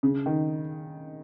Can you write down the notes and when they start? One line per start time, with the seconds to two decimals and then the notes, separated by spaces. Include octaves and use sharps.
0.03 C#3
0.26 D#3